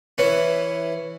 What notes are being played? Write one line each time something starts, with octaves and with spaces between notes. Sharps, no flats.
E3 C#4